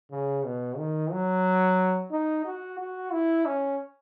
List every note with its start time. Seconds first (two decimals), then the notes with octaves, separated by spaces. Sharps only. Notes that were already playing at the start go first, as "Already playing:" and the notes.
0.11 C#3
0.44 B2
0.78 D#3
1.11 F#3
2.11 D#4
2.45 F#4
2.78 F#4
3.12 E4
3.46 C#4